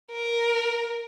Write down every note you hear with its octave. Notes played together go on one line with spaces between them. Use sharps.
A#4